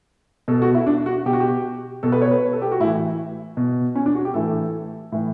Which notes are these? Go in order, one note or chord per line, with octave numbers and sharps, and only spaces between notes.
B2 A4
F#4
E4
D4
F#4
B2 G4
F#4
G4
B2 A4
B4
C#5
B4
A4
G4
F#4
A2 E3 E4
B2
C#4
D4
F#4
G4
A2 E3 A4
A2 E3